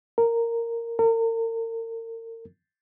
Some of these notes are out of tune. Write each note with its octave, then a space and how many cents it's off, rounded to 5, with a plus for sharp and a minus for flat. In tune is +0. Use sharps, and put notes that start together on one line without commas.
A#4 -10
A#4 -40